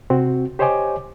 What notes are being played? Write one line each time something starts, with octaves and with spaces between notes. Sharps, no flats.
C3 C4 F#4
G4 C5 C#5 D#5 G#5 D6